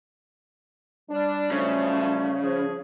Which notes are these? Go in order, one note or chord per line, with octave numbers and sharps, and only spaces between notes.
G3 D4
C#3 F3 F#3 A3
F3 G#4